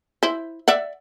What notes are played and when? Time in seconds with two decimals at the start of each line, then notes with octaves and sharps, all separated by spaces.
0.23 E4 C5
0.68 D5 E5 F#5